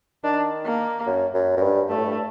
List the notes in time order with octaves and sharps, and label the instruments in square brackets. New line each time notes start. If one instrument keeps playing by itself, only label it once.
[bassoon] D#3 [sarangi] D4
[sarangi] A#3
[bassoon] F#2
F#2
F#2
G2
[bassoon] G2 [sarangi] A3
[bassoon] A2
G2